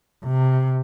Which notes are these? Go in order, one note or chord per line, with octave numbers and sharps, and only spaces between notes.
C3